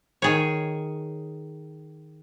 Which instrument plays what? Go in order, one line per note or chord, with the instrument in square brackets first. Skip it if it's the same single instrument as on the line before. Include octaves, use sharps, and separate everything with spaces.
[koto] D#3 G#4 C#5